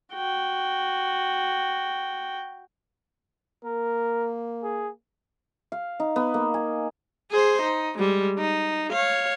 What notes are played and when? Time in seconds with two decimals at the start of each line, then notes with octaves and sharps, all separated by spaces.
0.13 F#4 G5
3.65 A#3 A#4
4.63 G#4
5.72 F5
6.00 D#4
6.16 B3
6.34 A#3
6.54 G#5
7.31 G#4 C5
7.62 D#4
7.98 G3 G#3
8.38 D#4
8.91 C#5 F5